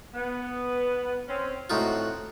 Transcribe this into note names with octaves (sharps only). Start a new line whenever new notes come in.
B3
C4 C#4
A2 C4 D#4 F4 F#4